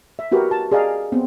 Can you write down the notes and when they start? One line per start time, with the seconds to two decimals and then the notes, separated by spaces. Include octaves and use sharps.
0.19 E5
0.32 E4 F#4 G4 A#4 B4
0.51 A5
0.72 G#4 D5 D#5 F5 A#5
1.12 B3 C4